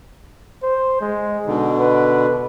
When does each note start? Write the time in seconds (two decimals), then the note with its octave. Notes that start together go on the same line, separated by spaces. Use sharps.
0.63 C5
1.00 G#3
1.46 B2 D3 D#4
1.79 B4